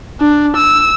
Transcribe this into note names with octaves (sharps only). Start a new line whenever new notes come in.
D4
E6